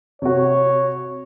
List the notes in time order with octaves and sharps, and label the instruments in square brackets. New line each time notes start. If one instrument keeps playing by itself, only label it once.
[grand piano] C3 F#4 [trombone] C#5